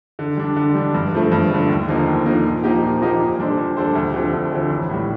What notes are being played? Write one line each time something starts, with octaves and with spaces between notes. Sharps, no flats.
D3
G3 D4
D3
G3 D4
G2
D3 F3 A3
G2
D3 F3 A3
D#2
D3 F3 A#3 D#4
D#2
D3 F3 A#3 D#4
A#2
F3 A#3 D#4 G4
A#2
F3 A#3 D#4 G4
A#2
G3 D4 A4 C5
A#2
G3 D4 A4 C5
D2
D3 F3 C4 G4
D2
D3 F3 C4 G4
A1
A2 G3